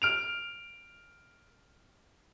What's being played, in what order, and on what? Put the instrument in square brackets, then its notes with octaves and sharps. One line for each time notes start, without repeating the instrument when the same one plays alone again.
[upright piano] F6 D7 F7